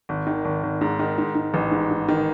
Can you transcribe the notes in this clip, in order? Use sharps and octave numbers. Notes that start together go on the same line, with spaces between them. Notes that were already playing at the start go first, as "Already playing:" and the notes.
G#1
D#3
G#1
G#1
G#2
D#3
G#2
G#2
A1
G#2
G#2
D#3